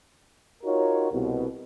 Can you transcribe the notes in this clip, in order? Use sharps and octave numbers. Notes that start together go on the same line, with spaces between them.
D#4 F4 F#4 A#4 C#5
C2 B2